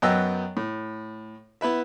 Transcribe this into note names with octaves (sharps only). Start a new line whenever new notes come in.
F#2 F#3 B3 D#5 G5 E6
A2
B3 E4 B4 E5